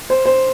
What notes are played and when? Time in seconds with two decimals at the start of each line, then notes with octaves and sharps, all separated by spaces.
0.10 C5
0.26 C5